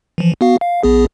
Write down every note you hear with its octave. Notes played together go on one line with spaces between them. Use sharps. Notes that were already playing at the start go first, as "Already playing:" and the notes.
E3 F3
B3 F#4 F5
F5
A#1 B3 G#4